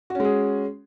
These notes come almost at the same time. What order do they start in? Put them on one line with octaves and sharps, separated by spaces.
F#4 C#4 G#3 G#4